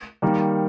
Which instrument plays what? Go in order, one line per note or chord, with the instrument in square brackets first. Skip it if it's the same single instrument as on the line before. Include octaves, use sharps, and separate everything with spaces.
[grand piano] D#3 G3 A#3